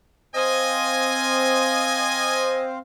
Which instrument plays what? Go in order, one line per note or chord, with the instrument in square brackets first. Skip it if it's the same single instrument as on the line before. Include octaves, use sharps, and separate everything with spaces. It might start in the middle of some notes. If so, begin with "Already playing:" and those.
[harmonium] C4 C5 F5 [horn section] D#5 G#5